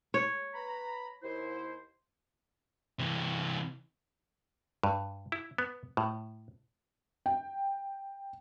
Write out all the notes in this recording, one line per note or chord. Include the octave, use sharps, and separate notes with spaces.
C#5
B4 A#5 B5
D#2 E4 C5
C3 E3
G2
E4
B3
A2
G5